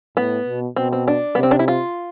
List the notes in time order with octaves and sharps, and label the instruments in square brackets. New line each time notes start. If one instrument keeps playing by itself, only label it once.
[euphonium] A2 [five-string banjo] B3
[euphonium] B2
[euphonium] B2 [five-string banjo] C4
[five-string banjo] C4
D4
B3
[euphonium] C3
[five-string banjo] C4
D4
E4
F4